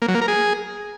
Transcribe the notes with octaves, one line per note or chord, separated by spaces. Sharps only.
A#3
F#3
A#3
A#4
G#4